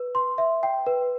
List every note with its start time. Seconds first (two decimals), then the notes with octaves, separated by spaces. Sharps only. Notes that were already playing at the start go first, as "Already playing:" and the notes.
Already playing: B4
0.15 C6
0.38 E5
0.63 G5
0.86 B4